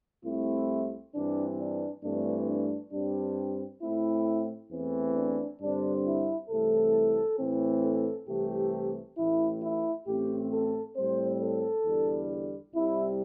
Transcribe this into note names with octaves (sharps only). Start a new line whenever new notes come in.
C2 C3 A3 C4 E4
G2 E3 C4 D4
D4
G2 E3 A3 C4 D4
D4
G2 G3 C4 D4
A2 A3 C4 E4
E2 E3 A3 C4
D4
G2 D3 G3 C4 D4
E4
C2 C3 E3 A3 A4
A2 E3 A3 C4
A4
C2 C3 E3 A3 G4
A1 A2 E3 E4
E4
A1 A2 A3 C4 G4
A4
A2 G3 C4 C5
A4
E2 D3 G3
C2 C3 G3 E4